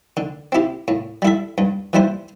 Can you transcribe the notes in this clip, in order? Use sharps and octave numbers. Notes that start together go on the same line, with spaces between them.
D3
C4 E4 G4
A2
G3 E4 A4 E5
G2
E3 G3 E4 C5